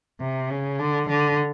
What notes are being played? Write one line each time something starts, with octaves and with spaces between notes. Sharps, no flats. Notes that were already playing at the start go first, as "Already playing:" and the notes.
C3
C#3
D3
D3